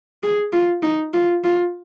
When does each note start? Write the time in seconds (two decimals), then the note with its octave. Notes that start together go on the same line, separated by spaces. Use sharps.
0.23 G#4
0.53 F4
0.83 D#4
1.14 F4
1.44 F4